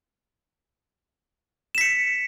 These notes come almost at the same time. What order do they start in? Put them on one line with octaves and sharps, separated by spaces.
E7 B6 C#7